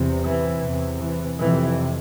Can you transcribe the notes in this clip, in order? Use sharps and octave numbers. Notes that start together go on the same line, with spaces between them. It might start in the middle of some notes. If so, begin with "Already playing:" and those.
Already playing: E2 C3
E3
E2 C3
E3
F2 C3 E3